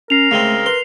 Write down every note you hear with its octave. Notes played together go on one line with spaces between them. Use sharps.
C#4 A#4 C7 F7
C#3 G#3 A3 C4
B4 C6